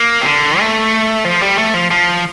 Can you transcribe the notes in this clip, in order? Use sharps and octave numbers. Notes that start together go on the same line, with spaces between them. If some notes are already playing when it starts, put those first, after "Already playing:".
Already playing: A#3
C3
D3
A3
F3
G3
A3
F3
F3